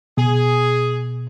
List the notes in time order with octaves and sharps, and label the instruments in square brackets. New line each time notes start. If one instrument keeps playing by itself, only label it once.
[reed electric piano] B2 [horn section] G#4